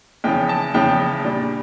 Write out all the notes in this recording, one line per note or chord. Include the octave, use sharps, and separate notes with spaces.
E2 C#3 F3 C#4 G5
A5
E2 C#3 F3 C#4 G5
A#2 G3 D4